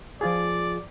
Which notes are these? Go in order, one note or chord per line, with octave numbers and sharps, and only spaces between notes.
F3 F4 G#4 D5